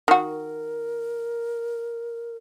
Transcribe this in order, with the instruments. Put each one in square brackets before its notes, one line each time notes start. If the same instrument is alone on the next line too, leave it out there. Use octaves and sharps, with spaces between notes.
[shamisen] D#3 F#4 [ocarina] A#4